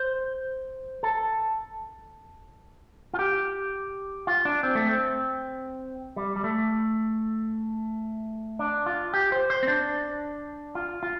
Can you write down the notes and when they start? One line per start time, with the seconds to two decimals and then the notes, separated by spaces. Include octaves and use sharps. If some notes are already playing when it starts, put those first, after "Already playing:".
Already playing: C5
1.03 A4
3.14 F4
3.19 G4
4.27 F4
4.45 D4
4.63 C4
4.75 A3
4.87 C4
6.16 G3
6.36 G3
6.44 A3
8.59 D4
8.86 F4
9.14 G4
9.32 C5
9.50 C5
9.63 C4
9.68 D4
10.75 F4
11.03 F4